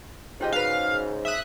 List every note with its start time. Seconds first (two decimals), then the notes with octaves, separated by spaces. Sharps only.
0.41 G#2 C#3 F4 G4 D#5
0.52 F#4 B4 F5
1.25 E5 D#6 F#6